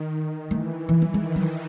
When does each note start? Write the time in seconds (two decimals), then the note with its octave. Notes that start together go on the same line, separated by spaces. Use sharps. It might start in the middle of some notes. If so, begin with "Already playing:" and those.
Already playing: D#3
0.51 E3 A3
0.89 E3
1.02 F#3
1.14 D#3 G#3
1.36 F#3